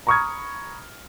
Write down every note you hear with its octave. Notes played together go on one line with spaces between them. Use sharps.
A#5 B5 C#6 D#6 F6 G#6